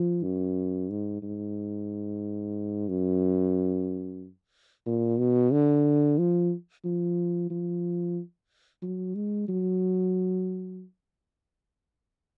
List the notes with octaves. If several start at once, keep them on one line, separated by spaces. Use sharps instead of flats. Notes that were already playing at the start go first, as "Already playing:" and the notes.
Already playing: F3
F#2
G#2
G#2
F#2
A#2
B2
D3
F3
F3
F3
F#3
G#3
F#3